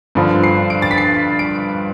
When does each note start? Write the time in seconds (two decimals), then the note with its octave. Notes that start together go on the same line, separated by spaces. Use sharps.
0.15 G2 D3 F3
0.43 C7
0.70 D7
0.82 A6
0.91 B6
0.98 C7
1.39 D7